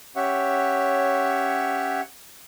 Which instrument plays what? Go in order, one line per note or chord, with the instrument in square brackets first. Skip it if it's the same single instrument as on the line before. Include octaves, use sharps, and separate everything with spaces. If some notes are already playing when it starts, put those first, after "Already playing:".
[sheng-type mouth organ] C#4 G4 C#5 E5 F#5